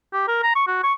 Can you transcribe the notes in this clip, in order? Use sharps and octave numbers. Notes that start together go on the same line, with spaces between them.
G4
A#4
A#5
C#6
F#4
C#6